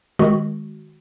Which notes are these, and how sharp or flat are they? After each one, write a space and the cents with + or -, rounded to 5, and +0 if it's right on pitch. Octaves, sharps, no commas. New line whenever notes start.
D#3 +0 G#3 +0 F#4 +0